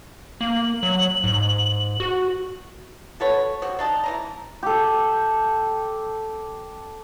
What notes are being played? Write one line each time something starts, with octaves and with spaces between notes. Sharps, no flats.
A#3 F#7
F#3
G#2
F#4
F#4 A4 B4 C#5
C4 F#4 G4
D4 D#4 A5
E3 G#5 A#5
G4 A4